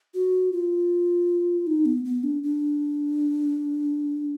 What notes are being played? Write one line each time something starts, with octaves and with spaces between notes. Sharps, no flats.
F#4
F4
D#4
B3
B3
D4
D4